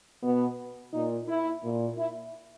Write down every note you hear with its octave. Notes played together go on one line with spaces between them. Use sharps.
B2 B3
A#2 D#4
E4
A#2
E4